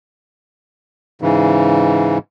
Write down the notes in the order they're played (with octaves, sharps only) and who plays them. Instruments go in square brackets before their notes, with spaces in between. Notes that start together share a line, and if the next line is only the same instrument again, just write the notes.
[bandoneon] G#2 C#3 E3